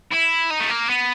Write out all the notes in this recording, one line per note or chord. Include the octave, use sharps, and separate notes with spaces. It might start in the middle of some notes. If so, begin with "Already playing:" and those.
E4
D#4
A3
A#3
B3